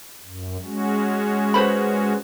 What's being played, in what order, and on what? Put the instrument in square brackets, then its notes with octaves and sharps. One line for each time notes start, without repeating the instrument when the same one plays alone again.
[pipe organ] F#2
G#3 C#4 F#4
[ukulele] B4 C5 B5